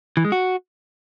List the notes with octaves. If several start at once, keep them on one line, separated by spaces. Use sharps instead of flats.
E3
G#3
F#4